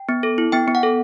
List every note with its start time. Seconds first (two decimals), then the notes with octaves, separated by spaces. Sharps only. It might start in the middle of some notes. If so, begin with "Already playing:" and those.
Already playing: G5
0.09 B3
0.23 A4
0.38 E4
0.52 B3 G5
0.68 B3
0.75 F#5
0.83 A4